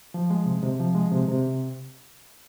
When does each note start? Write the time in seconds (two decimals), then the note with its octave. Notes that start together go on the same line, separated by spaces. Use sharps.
0.14 F3
0.30 G#3
0.46 C3
0.63 C3
0.79 F3
0.95 G#3
1.12 C3
1.28 C3